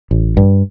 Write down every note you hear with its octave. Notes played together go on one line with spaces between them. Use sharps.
A1
G2